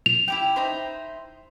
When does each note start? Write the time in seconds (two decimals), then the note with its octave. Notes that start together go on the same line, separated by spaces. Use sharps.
0.06 F7
0.28 E4 G4 G5
0.56 D#4 E4 C5